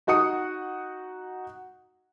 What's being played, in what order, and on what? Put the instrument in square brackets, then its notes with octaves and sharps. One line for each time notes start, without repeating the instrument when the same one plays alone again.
[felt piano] D#4 F#4 F#5 D#6 C#7